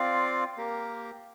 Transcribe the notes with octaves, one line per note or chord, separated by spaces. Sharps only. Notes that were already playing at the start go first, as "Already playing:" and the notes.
Already playing: C4 F4 D5 F5
A#3 G4 A#4